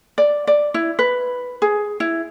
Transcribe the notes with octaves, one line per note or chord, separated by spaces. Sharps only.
D5
D5
E4
B4
G#4
E4